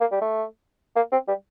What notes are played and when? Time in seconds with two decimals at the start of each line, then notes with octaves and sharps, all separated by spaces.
0.01 A#3
0.12 G3
0.21 A3
0.96 A#3
1.12 C4
1.28 G3